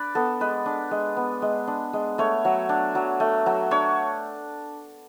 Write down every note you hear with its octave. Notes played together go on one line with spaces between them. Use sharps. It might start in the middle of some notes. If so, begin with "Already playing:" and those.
Already playing: D4 B4 D5
B3 A4
G#3 B4
D4
G#3
B3
G#3
D4
G#3
A3 C#5
F#3
D4
F#3
A3
F#3
D4 C#5